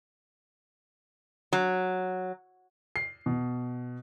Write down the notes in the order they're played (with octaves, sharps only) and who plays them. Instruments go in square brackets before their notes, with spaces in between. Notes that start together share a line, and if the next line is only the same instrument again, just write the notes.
[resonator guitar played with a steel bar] F#3
[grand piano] C7
B2